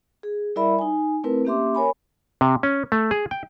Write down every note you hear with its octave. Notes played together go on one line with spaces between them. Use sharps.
G#4
G3 E4 A#4 D5 E5 B5
D#4 G#5
A3 C4 E4 A#4 B4
A#3 C#4 G4 E5 C6 D6
A#4 C#5 G#5 B5
C3
C#4
A3
G#4
G5